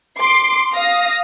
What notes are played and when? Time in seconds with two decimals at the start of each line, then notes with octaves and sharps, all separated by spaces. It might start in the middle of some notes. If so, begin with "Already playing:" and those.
0.19 C6 D6 C7
0.75 F5 D#6 A#6